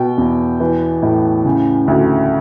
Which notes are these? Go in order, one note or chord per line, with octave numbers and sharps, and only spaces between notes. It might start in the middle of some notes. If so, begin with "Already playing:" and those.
Already playing: B2 G5
E2
E3
A2
C#3
D2